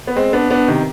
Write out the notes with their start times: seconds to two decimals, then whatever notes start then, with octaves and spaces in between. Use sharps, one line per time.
0.07 B3
0.16 G#3 C4
0.33 B3 D4
0.50 B3 D4
0.68 C3 D#3